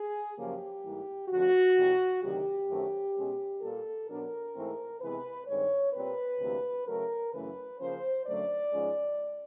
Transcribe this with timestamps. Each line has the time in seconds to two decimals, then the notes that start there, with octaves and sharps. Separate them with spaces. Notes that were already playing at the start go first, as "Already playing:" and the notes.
Already playing: G#4
0.37 F#2 C#3 F3 A#3 C#4 G4
0.83 G#2 E3 G3 A#3
1.29 F2 D3 F3 A3 F#4
1.77 F2 C3 E3 G3
2.22 D2 C3 D#3 F#3 G4
2.68 F#2 D#3 F#3 A3 C4
3.16 B2 G#3 C#4
3.62 A#2 G3 A#3 A4
4.08 B2 F#3 B3 D4 A#4
4.55 G#2 E3 A3 C4
5.01 C3 E3 G#3 B3 B4
5.47 G2 D#3 G#3 C4 C#5
5.94 A#2 G3 C4 B4
6.40 D2 C3 E3 G3 A#3
6.87 C#3 F#3 A3 A#4
7.33 F#2 C#3 E3 A3 B4
7.79 C#3 F3 A#3 C#4 C5
8.26 F#2 D3 F#3 A3 D5
8.72 G#2 F3 G#3 C#4